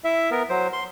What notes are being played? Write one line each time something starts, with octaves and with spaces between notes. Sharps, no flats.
E4 E5
B3 A#4
F#3 C5
C6